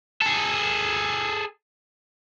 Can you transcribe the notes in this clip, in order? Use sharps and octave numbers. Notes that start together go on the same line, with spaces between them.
G#4 A4